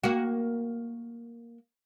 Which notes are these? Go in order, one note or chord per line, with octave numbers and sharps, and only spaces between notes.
A#3 F#4